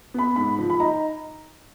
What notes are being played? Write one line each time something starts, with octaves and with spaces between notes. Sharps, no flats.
B3 B5
G#2 B5
F3
B5
D#4 A#5